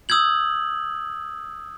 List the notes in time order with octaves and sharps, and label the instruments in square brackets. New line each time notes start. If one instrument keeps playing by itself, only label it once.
[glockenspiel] D#6 E6 G6 G#6 F#7